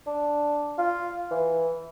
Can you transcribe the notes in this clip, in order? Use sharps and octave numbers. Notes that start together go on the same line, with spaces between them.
D4
F4
E3